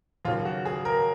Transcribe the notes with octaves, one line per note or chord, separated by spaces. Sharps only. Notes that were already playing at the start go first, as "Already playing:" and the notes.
D#2 C#3 F#3 F4
F#4
G#4
A#4